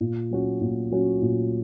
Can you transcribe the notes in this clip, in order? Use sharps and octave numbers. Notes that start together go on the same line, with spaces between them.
A#2
F#3 C#4 F#4
A#2
F#3 C#4 F#4
A#2